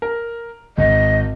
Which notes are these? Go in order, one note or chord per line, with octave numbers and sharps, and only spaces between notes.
A#4
G#1 D#5